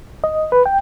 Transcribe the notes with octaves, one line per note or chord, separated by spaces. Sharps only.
D#5
B4
G5